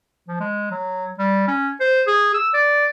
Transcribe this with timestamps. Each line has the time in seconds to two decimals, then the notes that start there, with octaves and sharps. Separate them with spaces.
0.28 F3
0.40 G#3
0.71 F#3
1.19 G3
1.48 C#4
1.80 C5
2.07 G#4
2.34 E6
2.53 D5